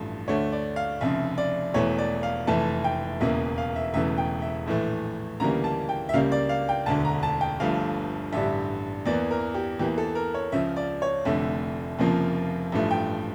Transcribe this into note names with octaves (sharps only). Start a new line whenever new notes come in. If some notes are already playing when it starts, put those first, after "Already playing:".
Already playing: A1 G2 F3 A3
D2 D3 A3 C#5
D5
F5
F1 F2 C#3 E5
D5
E1 E2 E3 A3 C#5
D5
F5
F1 F2 E3 A3 A5
G5
E1 E2 C#3 E3 A#3 E5
F5
E5
E1 E2 C#3 E3 A3 E5
G5
E5
A#1 A2 E3 A3
D2 C#3 E3 G3 A#3 A#5
A5
G5
E5
C#2 C#3 G3 A#3 F5
D5
F5
G5
E1 D2 D3 A5
A#5
A5
G5
G1 G2 F3 A3 F5
A1 G2 D3 G3 E5
E2 E3 A#3 D5
A#4
G4
E2 E3 A#3 G4
A4
A#4
C#5
C#2 C#3 F3 E5
D5
C#5
F1 F2 D3 A3 E5
F1 F2 C#3 F3 A#3
A1 G2 F3 A3
G5